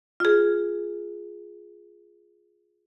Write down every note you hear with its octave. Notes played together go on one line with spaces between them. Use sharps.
F4 G#4